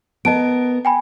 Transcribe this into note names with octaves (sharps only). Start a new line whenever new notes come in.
B3 A#4 D#5 A5 D7
G5 G#5 B5